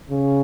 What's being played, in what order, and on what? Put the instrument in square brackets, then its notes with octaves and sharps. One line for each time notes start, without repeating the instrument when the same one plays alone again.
[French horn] C#3